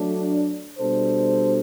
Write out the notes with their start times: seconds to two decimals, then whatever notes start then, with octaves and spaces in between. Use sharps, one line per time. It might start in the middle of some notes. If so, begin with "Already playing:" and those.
Already playing: F#3 A3 D4
0.79 B2 G3 D4 A4 C5